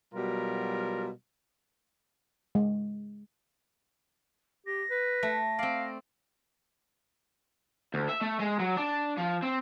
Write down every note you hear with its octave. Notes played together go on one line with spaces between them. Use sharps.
B2 F#3 G3 F4 A#4
G#3
G4 A#6
B4
A3
C4 D5 F5
D2
E5
A3
G#3
F#3
D4
F3
C4